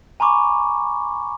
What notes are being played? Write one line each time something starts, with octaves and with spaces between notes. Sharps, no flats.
G#5 A#5 B5 C#6 D6